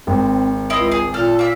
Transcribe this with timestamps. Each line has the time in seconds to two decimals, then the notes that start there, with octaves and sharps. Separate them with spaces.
0.07 G#1 C4
0.70 C#2 E4 F4 D#5
0.92 G#4
1.14 A#2 A4 F6
1.39 A#3 E5